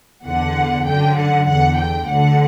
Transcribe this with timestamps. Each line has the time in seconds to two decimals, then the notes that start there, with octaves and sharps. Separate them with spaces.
0.24 E2 D3 F#5
0.86 F#2 D3 G5
1.16 F#5
1.46 E2 D3 F#5
1.77 G5
2.07 D2 D3 F#5